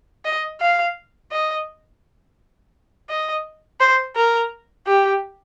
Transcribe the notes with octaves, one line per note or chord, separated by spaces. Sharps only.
D#5
F5
D#5
D#5
C5
A#4
G4